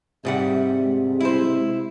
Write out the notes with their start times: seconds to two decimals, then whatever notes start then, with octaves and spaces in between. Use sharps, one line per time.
0.25 G#2 C3 G3 E5 F#5
0.83 G#3
1.20 E4 C5